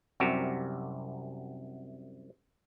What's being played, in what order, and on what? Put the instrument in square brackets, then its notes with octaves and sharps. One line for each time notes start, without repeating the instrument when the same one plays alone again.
[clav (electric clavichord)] C2 F#2 C3 F#4 G4